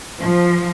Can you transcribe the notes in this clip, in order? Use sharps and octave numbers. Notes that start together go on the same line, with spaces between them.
F3